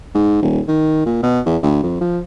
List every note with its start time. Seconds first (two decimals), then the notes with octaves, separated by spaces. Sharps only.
0.15 G#2
0.42 D#1
0.68 D#3
1.06 A#2
1.23 B2
1.46 E2
1.63 D2
1.83 F2
2.00 F3